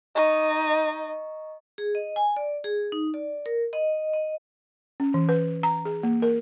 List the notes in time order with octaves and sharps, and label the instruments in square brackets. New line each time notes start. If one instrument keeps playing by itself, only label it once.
[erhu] D#4 [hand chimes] D#5 A#5 C#6
[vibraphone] G#4
D#5
G#5
D5
G#4
D#4
D5
A#4
D#5
D#5
[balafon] C#4
E3
B4
A#5
G#4
A#3
A#4